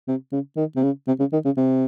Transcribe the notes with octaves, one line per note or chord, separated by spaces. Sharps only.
C3
C#3
D#3
C3
C#3
C3
C#3
D#3
C#3
C3